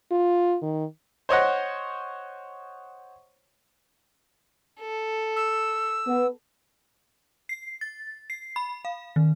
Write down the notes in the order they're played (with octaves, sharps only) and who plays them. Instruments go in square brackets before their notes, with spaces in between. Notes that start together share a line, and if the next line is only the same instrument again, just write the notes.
[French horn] F4
D#3
[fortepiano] C5 C#5 D#5 F#5
[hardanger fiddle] A4
[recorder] E6
[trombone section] B3
[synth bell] C7
A6
C7
B5
F5
D#3